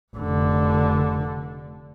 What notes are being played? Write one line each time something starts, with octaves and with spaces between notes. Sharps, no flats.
F1 D3